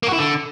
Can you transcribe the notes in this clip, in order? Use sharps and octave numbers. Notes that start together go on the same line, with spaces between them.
A#3
F#4
E4
D3